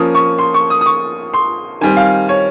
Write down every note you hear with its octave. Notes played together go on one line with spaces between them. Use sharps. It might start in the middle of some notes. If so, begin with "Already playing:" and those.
Already playing: F3 A#3 C#4 D#6
C#6
C6
C#6
D#6
D#6
C#6
C6
D#3 G3 C4 G#5
F5
C#5